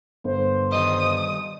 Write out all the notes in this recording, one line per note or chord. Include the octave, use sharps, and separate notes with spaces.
G1 C5
D#3 G3 D#5 D#6